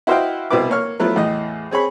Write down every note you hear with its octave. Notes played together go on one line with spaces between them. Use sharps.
E4 F#4 C5 D#5 F5 G5
C2 B2 C4 E4 B4 D6
A#3 C#5 F6
F3 F#3 A3 B3 E4 B4
E2 A2 D#5
C4 G#4 C#5 B5